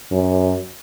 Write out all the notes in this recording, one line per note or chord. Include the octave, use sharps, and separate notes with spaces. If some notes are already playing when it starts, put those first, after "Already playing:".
F#2